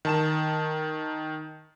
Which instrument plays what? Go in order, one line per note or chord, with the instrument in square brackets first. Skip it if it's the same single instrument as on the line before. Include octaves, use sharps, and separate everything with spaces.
[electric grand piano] D#3 A5 E7